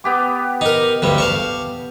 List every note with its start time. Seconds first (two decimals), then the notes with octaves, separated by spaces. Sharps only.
0.04 B3 G4 D6
0.61 D#4 A#4
1.02 D2 G2 G3
1.18 F5 A5 C#6